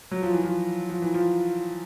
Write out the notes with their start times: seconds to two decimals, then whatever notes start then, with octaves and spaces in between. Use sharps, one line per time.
0.11 F#3
0.22 F3
0.33 E3
0.43 F3
0.89 F3
1.02 E3
1.14 F3